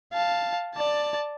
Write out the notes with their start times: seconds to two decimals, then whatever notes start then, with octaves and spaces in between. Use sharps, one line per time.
0.13 F5 A5
0.75 D5 A5